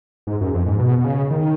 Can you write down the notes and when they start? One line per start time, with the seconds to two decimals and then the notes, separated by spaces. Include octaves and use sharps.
0.27 G#2
0.41 F#2
0.54 F2
0.66 G#2
0.79 B2
0.99 B2
1.04 C#3
1.31 D#3